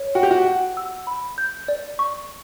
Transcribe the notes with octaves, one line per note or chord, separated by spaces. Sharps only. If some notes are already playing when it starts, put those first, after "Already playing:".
Already playing: C#5
F#4 G5
G4
F#4
F#5
E6
B5
G6
D5
C#6